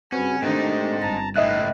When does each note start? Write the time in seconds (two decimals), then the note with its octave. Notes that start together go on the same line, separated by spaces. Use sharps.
0.12 G2 C#3 C4 C#4 F#4 B4
0.42 G#2 D#3 A3 D4 D#4 G4 C5
1.02 G1 A5 A#5
1.36 C#2 A2 D#4 D#5 E5 F#6